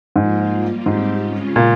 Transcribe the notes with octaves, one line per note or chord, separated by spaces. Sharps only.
G#2 F3 A#3 F4
G3 A#3 F4
G#2 G3 C4 G4
C#3 G#3 C#4 F4
A#2